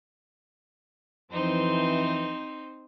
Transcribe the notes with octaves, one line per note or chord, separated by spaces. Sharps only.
F2 E3 C4 D#4 C5